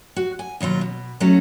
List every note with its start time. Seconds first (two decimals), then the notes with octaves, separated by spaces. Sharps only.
0.16 F#4
0.39 G#5
0.61 D#2 B2 F#3 F4
0.81 B2
1.20 F#3 A3 C#4 D#4 F#4 C#5